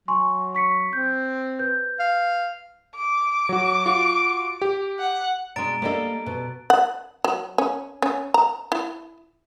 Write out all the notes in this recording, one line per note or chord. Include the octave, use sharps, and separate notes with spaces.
F#3 G#5 C6 C#6
C#6 B6 C#7
C4 G6
B4 G6
F5
D6
F#3 F#4
F4 F#4
G4
F#5
B2 G#3 D4 A#5 A6 D7
G3 A#3 D4 A4 D#5
B2
F#5
F#3
C#4
C#4
A#5
E4